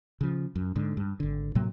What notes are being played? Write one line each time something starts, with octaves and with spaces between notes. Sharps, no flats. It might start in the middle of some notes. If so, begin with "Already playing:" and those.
C#3 F3
F#2
G#2 D3
G2
G#1 D3
A2 C3 F#3 A#3